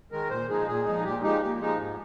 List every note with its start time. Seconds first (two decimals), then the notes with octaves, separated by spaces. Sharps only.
0.12 D#3 G#3 A#4
0.30 A#2 C5
0.49 F3 G#3 D#4 G#4
0.67 A#2 G#4
0.85 F3 G#3 D#4
1.04 A#2 G4
1.22 F3 G#3 D#4 G4
1.41 A#2 G4
1.60 F3 G#3 D#4
1.78 G#2